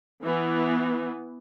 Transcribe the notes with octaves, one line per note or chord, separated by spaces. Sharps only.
E3 B3